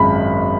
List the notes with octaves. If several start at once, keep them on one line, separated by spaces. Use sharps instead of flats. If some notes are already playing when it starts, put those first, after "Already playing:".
Already playing: G#1 F#2 G#3 B5